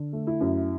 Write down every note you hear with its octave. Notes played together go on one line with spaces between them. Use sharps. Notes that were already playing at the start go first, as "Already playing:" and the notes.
Already playing: D3
A3
E4
F#2